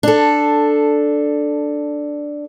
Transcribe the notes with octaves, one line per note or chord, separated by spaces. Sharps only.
D4 A4